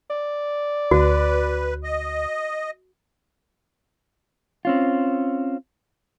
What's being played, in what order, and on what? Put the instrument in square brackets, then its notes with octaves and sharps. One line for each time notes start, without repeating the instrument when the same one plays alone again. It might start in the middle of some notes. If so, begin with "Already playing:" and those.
[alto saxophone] D5
[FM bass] D2 [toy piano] F#4 [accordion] B4
[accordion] D#5
[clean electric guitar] C4 C#4 F4